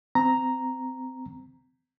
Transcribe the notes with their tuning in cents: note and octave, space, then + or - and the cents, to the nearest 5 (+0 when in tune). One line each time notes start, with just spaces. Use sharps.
C4 -25 A#5 +0